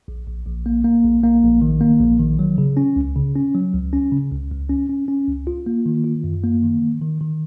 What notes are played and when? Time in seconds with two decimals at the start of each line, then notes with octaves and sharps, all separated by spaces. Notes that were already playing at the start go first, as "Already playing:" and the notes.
0.08 A#1
0.27 A#1
0.46 A#1
0.66 A#3
0.84 A#3
1.03 A#1
1.23 A#3
1.43 A#1
1.62 D#3
1.81 A#3
2.00 A#1
2.19 D#3
2.39 F#3
2.58 C#3
2.77 C#4
2.96 C#2
3.16 C#3
3.35 C#4
3.54 F#3
3.74 C#2
3.93 C#4
4.12 C#3
4.31 C#2
4.51 C#2
4.70 C#4
4.89 C#4
5.08 C#4
5.28 C#2
5.47 F4
5.66 A#3
5.86 D#3
6.04 F4
6.24 F#2
6.43 A#3
6.63 D#3
6.82 D#3
7.02 D#3
7.21 D#3